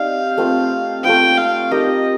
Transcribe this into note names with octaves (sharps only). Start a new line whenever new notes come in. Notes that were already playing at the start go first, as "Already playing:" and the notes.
Already playing: C4 D#4 G4 D5 F5
A3 C4 F4 C5
A3 C4 F4 C5 G5
F5
D#4 G4 A#4 D#5